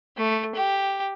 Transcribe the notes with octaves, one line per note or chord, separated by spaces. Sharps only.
A3
G4